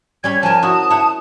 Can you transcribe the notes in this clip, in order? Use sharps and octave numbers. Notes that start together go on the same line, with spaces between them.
G3 C#4 B5 G#6
F3 A#4 G#5 A5
E4 F#4 D#6
E4 F#5